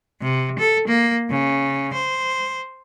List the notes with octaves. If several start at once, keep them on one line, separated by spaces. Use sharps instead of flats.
C3
A4
A#3
C#3
C5